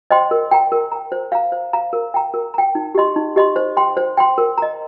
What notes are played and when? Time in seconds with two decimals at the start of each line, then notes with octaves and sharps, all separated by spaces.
0.11 C5 D#5 G5 C6
0.31 A#4
0.51 G5 A#5
0.72 A#4
0.92 G5 A#5
1.12 C5
1.32 F5 A#5
1.52 C5
1.73 F5 A#5
1.93 A#4
2.14 G5 A#5
2.34 A#4
2.54 G5 A#5
2.75 D#4
2.95 G4 D#5 C6
3.16 D#4
3.36 G4 D#5 C6
3.56 C5
3.77 G5 C6
3.97 C5
4.17 G5 C6
4.38 A#4
4.58 D#5 A#5